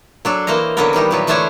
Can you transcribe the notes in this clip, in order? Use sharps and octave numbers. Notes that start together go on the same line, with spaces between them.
F#3 D4 A4
E3 A#3 C5 D#5 A#5
D3 D#3 F#3 A#3 B3 A#4
D#3 E3 G3 D#4
A#2 F#3 B3
D3 E3 A3 D4 C5 C#5